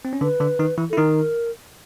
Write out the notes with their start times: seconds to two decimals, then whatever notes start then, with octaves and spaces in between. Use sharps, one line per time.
0.05 C4
0.13 C#4
0.21 D3 D4 B4
0.40 D3 D4
0.59 D#3 D#4
0.78 E3 E4
0.90 A4
0.93 E4
0.97 D#3 D#4 A#4